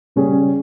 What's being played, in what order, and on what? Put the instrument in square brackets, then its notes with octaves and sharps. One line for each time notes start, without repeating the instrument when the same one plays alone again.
[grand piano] C#3 G3 C#4 G#4